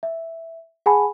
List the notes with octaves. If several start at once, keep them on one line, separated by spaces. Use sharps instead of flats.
E5
G#4 F#5 G#5 A5 B5